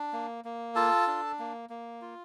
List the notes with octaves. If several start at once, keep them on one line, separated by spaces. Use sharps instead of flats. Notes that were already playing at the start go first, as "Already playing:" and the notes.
Already playing: D4
A#3
A#3
F4 A4 A5
D4
A#3
A#3
F4